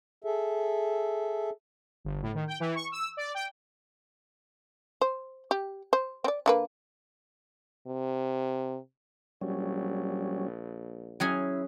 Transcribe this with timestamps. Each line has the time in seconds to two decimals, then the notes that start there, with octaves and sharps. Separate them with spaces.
0.24 G#4 A4 E5
2.05 G1
2.22 A2
2.34 D#3
2.47 G5
2.60 E3
2.75 C#6
2.92 E6
3.17 D5
3.34 G5
5.01 C5
5.51 G4
5.93 C5
6.24 C4 D5
6.46 D3 A#3 B4
7.87 C3
9.41 A#1 F#3 G3 C#4
11.20 F#3 C#4 E4 G#4